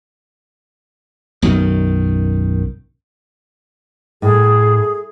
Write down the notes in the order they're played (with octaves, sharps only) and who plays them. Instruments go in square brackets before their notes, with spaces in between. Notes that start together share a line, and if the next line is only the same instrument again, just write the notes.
[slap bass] B1 F#2 D#3
[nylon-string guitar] A2 [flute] G#4